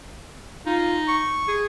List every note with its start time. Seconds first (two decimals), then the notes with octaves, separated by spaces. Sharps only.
0.66 D#4 F4
1.08 C#6
1.48 G#4